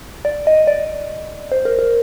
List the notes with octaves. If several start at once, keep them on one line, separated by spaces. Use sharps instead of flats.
D5
D#5
D5
C5
A#4
A#4